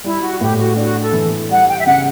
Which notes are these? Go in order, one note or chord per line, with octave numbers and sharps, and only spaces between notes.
G3 E4
F#4
A2 G4
F#4
D4 F#4
A4
E3
G3 F#5
G5
E5
C#3 F#5